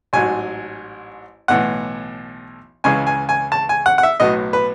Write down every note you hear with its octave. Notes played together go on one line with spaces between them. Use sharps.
A1 G#2 F#3 G#5
B1 A2 E3 F#5
C#2 C#3 E3 G#3 G#5
G#5
G#5
A5
G#5
F#5
F#5
E5
B1 A2 F#3 B3 D#5
B4